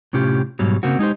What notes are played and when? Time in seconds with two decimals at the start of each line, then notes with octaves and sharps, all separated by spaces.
0.13 A2 C3 C#4 F4 G4
0.59 G#2 B2 F#3 G3
0.83 C#3 A#3 C4 F#4
0.99 G#3 D#4 G4 C5